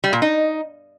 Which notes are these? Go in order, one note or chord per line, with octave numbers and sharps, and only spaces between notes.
G3
A#2
D#4